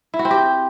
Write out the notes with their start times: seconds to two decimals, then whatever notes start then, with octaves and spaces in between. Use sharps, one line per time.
0.14 E4
0.19 F#4
0.25 C4
0.31 G4